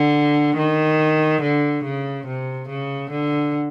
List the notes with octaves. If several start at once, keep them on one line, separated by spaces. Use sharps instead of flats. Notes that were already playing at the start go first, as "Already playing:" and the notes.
Already playing: D3
D#3
D3
C#3
C3
C#3
D3